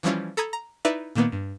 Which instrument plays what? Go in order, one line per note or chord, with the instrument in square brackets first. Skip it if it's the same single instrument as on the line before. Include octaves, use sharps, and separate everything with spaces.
[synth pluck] E3 F3 G3 C#4 E4 F4
A4 A#5 B5 D#6 G#6
A#5
D#4 E4 B4 D5 E5
A#2 D#3 A#3 B3
G2